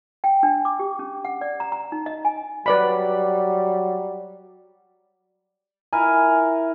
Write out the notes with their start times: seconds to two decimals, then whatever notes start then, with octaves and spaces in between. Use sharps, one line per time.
0.24 G5
0.43 D4
0.65 D6
0.79 G4
0.99 C#4
1.25 F#5
1.41 D5
1.60 A#5
1.72 A#5
1.92 D#4
2.06 D#5
2.25 G#5
2.66 F#3 G3 B4 D5 B5
5.93 E4 A#4 G#5